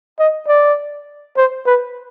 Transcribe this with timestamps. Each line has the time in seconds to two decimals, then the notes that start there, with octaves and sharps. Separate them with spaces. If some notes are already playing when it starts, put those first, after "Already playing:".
0.19 D#5
0.48 D5
1.37 C5
1.66 B4